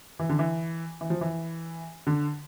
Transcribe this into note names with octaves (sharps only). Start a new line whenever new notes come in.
E3
D3
E3
E3
F3
E3
D3